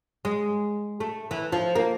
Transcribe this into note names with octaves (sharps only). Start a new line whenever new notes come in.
G#3
A3
E3
F3
A#3